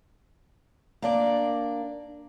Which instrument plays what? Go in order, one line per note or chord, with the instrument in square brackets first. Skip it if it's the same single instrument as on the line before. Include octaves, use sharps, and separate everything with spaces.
[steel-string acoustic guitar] A#3 D4 D5